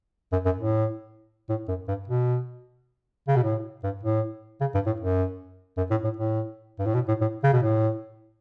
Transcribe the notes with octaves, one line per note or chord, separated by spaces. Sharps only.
F#2
F#2
A2
A2
F#2
G2
B2
C#3
B2
A2
G2
A2
C#3
G2
A2
F#2
F#2
A2
A2
A2
G2
A2
B2
A2
A2
C#3
B2
A2